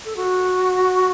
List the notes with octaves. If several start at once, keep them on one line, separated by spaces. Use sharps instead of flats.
A4
F#4